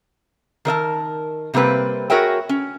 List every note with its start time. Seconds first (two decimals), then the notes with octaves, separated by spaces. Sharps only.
0.65 D#3 A#4 D#5 A5
1.54 C3 G3 A#3 C4 B4
2.10 F#4 G#4 A#4 C#5 E5 G5
2.49 C#4